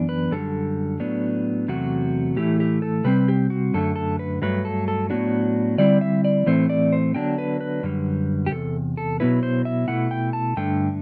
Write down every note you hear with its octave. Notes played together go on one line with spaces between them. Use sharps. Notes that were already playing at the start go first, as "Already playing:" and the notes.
Already playing: F#2 E3 B3 D4
B4
F#2 D3 G3 A4
A2 F#3 B3 D4
E2 C3 F#3 A3 F#4
A2 E3 A3 E4 G4
G4
A4
C3 G3 C4 B4
G4
F#4
F#2 D3 A3 A4
A4
B4
G2 F#3 A3 B4
A4
A4
A2 F#3 B3 D4 F#4
D3 G3 C4 E4 D5
E5
D5
A2 E3 A3 C4 C5
D5
C5
D3 F#3 B3 D4 G5
B4
B4
F#2 D3 G3
G4
E2 C3 A4
A4
B2 F#3 B3 E4 B4
C5
E5
B2 A3 E4 F#5
G5
A5
G2 D3 A3 D4 G5